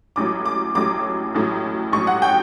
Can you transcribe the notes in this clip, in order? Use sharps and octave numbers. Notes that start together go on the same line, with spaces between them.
A1 A2 F#3 D6
D6
A1 A2 F#3 D6
A1 A2 F#3
A1 A2 F#3 C#6
F#5
G5